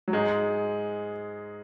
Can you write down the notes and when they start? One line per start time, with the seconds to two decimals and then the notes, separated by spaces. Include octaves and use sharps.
0.08 F#3
0.13 G#2 G#3